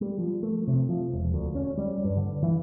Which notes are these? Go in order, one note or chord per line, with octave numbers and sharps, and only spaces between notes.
G3
F3
A3
C3
F3
E1
D2
C#4
G3
G2
D3
E3